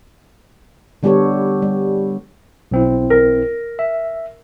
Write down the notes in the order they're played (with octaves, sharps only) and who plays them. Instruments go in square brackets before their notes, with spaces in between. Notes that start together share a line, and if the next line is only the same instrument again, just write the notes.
[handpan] D3 G3 B3 G4 A4 C#5
G3
[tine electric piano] B1 C4 E4
[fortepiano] A#4
[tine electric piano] E5